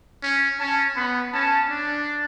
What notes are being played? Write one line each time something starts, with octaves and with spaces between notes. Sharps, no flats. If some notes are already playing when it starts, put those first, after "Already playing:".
C#4
C#4 A5
B3 B5
C#4 A5
D4